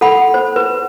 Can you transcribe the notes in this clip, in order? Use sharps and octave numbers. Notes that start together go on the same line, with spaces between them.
A4 F#5 B5
C5
B4